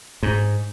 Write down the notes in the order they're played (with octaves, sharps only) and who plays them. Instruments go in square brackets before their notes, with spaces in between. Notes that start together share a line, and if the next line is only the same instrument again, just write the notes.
[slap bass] G#2